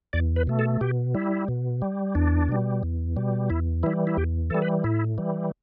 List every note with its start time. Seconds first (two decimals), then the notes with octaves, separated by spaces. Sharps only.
0.13 E2 D5
0.36 B4
0.47 B2 A3
0.59 A4
0.81 B2 G4
1.15 G3 E4
1.48 B2
1.82 G3
2.15 E2 D4
2.49 B2 G3
2.83 E2
3.16 B2 G3
3.50 E2 E4
3.83 E3 G3 E4
4.07 E4
4.17 E2 G4
4.50 E3 G3 A4
4.62 B4
4.84 A2 E4
5.18 E3 G3